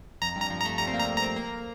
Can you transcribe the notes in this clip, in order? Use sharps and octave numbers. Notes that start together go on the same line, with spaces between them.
F2 A#5
G2 A#5
F3
A#5
A3
G3 A#5
C4
A#3
A#5
A#3
A#5
C4
A#3